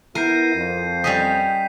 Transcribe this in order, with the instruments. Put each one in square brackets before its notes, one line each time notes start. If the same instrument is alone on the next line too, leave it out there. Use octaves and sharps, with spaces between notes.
[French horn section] B3 E4 [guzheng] A#4 [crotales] G6 C7 D#7
[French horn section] F2
[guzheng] G3 C#4 D#5 [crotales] B6